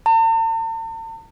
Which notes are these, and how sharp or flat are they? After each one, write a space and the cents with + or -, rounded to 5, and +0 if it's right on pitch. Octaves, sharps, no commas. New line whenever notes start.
A5 +45